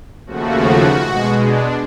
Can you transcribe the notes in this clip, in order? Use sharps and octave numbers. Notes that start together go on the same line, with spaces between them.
D#2 C#3 F3 A3 F#4
B2 G#3
D4